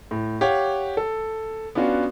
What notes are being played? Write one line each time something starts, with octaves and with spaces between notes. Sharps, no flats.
A2
G4 C#5 F5 F#5
A4
B3 C#4 D4 F4 F#4